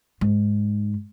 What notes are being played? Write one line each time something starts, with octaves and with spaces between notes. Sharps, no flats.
G#2